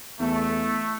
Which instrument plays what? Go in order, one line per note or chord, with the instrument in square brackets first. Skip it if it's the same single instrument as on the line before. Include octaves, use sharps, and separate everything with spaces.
[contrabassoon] E2 [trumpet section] A3